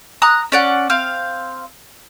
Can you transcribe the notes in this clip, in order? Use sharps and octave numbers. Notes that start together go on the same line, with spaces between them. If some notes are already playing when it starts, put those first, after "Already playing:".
A#5 D#6 F#6
C#4 D5 F#5
C4 F5